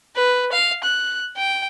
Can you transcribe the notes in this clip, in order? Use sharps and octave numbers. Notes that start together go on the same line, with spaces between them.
B4
F5
F#6
G5